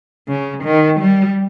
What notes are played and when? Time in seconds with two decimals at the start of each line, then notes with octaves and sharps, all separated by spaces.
0.28 C#3
0.64 D#3
1.01 G3